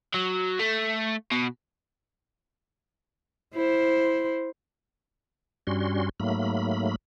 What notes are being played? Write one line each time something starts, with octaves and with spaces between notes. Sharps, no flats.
F#3
A3
B2
E4 C5
G2 G3 C#4 F#4 C6
G#2 F#3 A3 A#3 B5